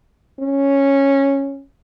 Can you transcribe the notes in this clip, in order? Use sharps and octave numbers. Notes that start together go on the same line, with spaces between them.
C#4